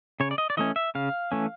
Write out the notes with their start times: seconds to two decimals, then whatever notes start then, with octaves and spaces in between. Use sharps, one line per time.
0.20 C#3 C#5
0.31 D5
0.38 D#5
0.50 D5
0.57 E3 A3 C#4 D#5
0.76 E5
0.95 C#3 F5
1.32 E3 A3 C#4